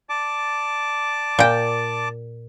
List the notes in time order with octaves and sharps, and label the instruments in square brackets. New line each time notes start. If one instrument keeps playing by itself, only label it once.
[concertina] D5 A5 D6
[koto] A#2 G5